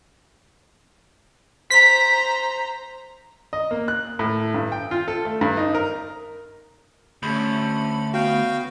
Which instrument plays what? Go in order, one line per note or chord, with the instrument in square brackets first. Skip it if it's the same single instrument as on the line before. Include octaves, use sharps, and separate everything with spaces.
[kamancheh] C5 A#5 [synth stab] B6
[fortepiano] D#5
A#3
F#6
A2
G2
G5
F4
A4
A3
G2
D#4
A#4
[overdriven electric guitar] D2 [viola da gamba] A3 C#4 [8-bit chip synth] B5
[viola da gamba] B3 [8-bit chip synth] F#4 [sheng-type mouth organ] F5 G5